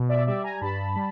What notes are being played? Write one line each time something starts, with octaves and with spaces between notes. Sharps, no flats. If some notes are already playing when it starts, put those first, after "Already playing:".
Already playing: B2
D5 E5
G3 D5 E5
G#5 A#5
G2 A5 B5
G3